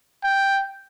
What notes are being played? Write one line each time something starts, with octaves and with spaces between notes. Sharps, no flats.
G5